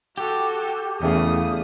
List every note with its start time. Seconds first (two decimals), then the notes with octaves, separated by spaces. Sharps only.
0.18 F#4 G4 A4
1.01 E2 C#3 A3 F5 D#6